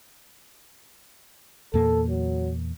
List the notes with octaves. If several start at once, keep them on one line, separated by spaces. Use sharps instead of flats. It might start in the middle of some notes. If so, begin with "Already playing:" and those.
E2 A#2 A#3 A4
F#3